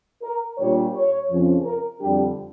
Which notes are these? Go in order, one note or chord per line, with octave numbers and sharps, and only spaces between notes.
A#4
A#2 G3 D4 C#5
C#5
F2 C#3 F3 C#4
A#4
F2 D3 G3 D4 G4